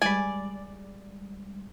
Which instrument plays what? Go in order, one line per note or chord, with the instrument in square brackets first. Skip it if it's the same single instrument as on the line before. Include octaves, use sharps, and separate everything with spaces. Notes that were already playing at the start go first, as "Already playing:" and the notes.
[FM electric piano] G3 G#3 [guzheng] D5 [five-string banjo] G#5 B5